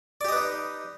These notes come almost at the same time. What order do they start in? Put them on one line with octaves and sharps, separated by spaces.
D5 G4 D#5 B4 D#4